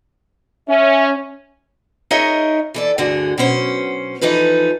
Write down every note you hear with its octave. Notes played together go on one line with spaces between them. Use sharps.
C#4 E5
D#4 G#4 A#4 C#5 D#5 E5
E3 A4 D5
D2 G2 D3 F#4 G#4
B2 F#3 C#4 C5
E3 F3 D#4 A4 B4